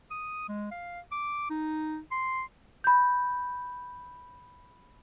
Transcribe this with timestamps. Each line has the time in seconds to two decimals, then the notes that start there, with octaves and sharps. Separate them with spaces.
0.11 D#6
0.48 G#3
0.71 F5
1.12 D6
1.50 D#4
2.11 C6
2.84 B5 G6